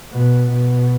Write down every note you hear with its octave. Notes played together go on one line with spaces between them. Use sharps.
B2
B2